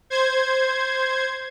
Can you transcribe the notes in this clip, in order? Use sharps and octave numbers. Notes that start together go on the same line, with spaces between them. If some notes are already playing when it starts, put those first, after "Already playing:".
C5 G#6